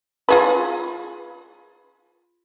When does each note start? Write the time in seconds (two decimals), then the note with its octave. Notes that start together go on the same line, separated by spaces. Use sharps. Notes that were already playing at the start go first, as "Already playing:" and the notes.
0.29 F4 G#4 B4